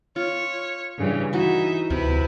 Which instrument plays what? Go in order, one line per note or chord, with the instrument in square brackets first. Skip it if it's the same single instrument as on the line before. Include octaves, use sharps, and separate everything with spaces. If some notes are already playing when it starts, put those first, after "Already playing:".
[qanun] F4 [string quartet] C#5
[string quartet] G2 C#3 E3
[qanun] E3 F#4 [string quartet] D#4 E5
[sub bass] D2 [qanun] C3 [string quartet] E4 B4